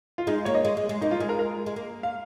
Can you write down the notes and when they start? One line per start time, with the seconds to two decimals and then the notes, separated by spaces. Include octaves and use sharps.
0.18 F4
0.27 G#3 D#4
0.45 A#3 C#5
0.55 D#5
0.65 G#3
0.77 G#3
0.89 G#3
1.01 A#3 D#4
1.11 F4
1.20 G#3 G#4
1.29 A#4
1.39 A#4
1.66 G#3
1.76 A#3
2.03 F5